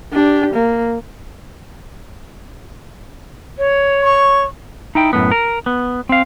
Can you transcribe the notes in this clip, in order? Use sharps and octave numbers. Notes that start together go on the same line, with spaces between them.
D4 G4
A#3
C#5
C#6
D#4 E4 G5
F#2 A2 B3
A#4
B3
C4 F5